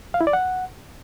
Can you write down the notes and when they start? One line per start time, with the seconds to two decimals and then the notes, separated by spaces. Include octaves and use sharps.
0.14 F5
0.21 E4
0.27 D5
0.33 F#5